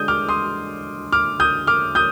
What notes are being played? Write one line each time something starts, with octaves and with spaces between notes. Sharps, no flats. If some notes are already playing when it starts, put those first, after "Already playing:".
Already playing: D3 G#3 D4 D#6 G6
D6 F6
C6 D#6
D6 F6
D#6 G6
D6 F6
D#6 G6